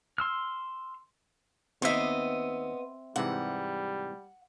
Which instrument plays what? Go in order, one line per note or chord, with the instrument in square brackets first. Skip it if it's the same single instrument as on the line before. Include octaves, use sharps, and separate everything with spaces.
[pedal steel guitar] C6 E6 F6
[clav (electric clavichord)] D#2 [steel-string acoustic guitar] B3 D#5 [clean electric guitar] C4 E5
[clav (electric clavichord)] G#2 C3 E3 [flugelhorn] G3 [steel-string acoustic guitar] F#5